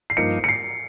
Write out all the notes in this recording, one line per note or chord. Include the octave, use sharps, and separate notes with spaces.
C7
G2 F3 A#3 D#4 C#7
C#7
C7